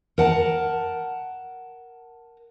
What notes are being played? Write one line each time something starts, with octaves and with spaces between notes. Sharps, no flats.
A#4 F#5 A5